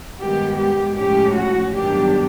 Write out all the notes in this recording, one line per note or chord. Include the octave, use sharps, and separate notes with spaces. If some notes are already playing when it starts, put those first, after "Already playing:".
G2 D#3 G#3 B3 G4
G4
A2 F3 G#3 C#4 G4
F#4
G2 D#3 F#3 B3 D4 G4